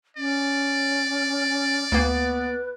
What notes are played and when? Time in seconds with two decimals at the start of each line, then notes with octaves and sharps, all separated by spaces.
0.17 C#4 D5
1.92 D2 A#3 B3 B4